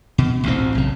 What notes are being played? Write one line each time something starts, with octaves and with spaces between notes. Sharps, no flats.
B2
A1 D2 C4
B1 C#3